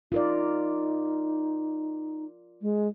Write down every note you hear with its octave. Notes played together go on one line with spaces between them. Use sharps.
D#4 F4 A#4 D5
G#3